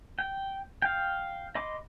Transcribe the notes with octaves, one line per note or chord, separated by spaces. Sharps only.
G5
F5 G5
D#5 B5 C6 D6